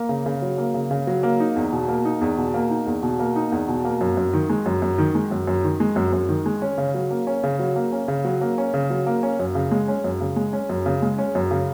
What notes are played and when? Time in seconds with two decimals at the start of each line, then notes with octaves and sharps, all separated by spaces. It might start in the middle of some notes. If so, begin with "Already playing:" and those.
Already playing: A#3
0.09 C#3
0.26 C#3
0.42 F#3
0.58 A#3
0.74 C#3
0.91 C#3
1.07 F#3
1.23 A#3
1.40 D#4
1.56 E2
1.73 B2
1.88 A#3
2.05 D#4
2.21 E2
2.38 B2
2.54 A#3
2.70 D#4
2.87 E2
3.03 B2
3.19 A#3
3.36 D#4
3.52 E2
3.68 B2
3.85 A#3
4.01 F#2
4.17 F#2
4.33 D#3
4.49 G#3
4.66 F#2
4.82 F#2
4.98 D#3
5.15 G#3
5.31 F#2
5.47 F#2
5.64 D#3
5.80 G#3
5.96 F#2
6.13 F#2
6.29 D#3
6.46 G#3
6.62 C#4
6.78 C#3
6.94 F#3
7.11 A#3
7.27 C#4
7.43 C#3
7.59 F#3
7.76 A#3
7.92 C#4
8.08 C#3
8.25 F#3
8.41 A#3
8.58 C#4
8.74 C#3
8.90 F#3
9.07 A#3
9.23 C#4
9.39 F#2
9.55 C#3
9.71 G#3
9.88 C#4
10.04 F#2
10.21 C#3
10.36 G#3
10.53 C#4
10.69 F#2
10.86 C#3
11.02 G#3
11.18 C#4
11.35 F#2
11.51 C#3